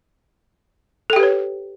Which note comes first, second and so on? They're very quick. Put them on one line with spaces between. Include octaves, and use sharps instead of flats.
A4 G5 G4 B4 C#5